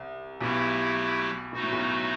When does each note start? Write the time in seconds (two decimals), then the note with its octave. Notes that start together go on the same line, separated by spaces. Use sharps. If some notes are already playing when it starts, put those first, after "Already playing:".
Already playing: C2
0.41 B1 B2 F#3 A3 E4 G4
1.53 B2 F#3 A3 D#4 F#4
1.63 A2
1.73 B1 B2